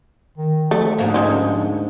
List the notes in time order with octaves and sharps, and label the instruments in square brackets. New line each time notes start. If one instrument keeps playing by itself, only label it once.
[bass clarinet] D#3
[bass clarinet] F3 [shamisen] A3
[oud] D2 G#2 A#3
[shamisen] D#3 C#4 F4